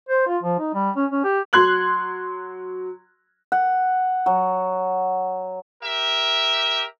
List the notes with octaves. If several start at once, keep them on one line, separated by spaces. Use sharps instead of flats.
C5
F4
F3
D#4
G3
C#4
C#4
G4
F#3 C6 F#6 G#6 F#7
F#5
F#3
G4 A#4 E5